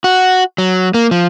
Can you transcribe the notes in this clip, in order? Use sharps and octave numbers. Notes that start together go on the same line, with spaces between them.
F#4
F#3
A#3
F3